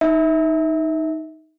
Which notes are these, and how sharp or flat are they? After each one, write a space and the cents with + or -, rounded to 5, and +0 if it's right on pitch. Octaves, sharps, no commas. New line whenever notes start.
D#4 +10 E5 -20